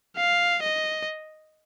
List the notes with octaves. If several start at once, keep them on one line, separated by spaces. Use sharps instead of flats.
F5
D#5